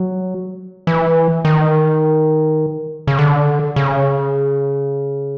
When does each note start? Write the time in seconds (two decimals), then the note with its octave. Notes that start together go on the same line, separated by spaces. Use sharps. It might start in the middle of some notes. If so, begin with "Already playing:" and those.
Already playing: F#3
0.87 E3
1.45 D#3
3.07 C#3
3.19 D3
3.76 C#3